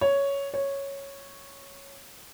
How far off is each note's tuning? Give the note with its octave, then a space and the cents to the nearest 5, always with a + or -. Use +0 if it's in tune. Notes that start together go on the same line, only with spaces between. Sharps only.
C#5 +5
C#5 -5